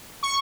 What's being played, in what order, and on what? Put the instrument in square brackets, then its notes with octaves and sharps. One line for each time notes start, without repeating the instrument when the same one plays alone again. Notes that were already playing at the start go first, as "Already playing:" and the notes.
[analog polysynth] C#6